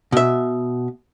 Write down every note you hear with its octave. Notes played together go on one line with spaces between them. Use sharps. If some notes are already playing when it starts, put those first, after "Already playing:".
B2 E5